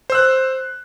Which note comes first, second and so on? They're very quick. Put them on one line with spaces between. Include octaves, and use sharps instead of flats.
C5 E6 F#6